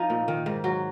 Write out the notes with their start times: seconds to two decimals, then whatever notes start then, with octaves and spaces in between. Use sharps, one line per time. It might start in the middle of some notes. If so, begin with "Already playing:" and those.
Already playing: F3 D#4
0.10 A#2
0.28 D#3
0.46 G#2
0.64 F#3